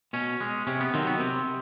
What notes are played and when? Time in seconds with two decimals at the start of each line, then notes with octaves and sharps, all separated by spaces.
0.13 B2 C#4
0.41 G#3
0.67 C3 C#4
0.80 B3
0.93 D#3 F#3 C4
1.07 B3
1.19 C3 C4